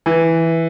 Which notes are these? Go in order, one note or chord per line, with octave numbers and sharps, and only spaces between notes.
E3